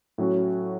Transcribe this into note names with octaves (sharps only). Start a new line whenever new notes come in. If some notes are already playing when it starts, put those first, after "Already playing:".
A2 F#3 C#4 F#4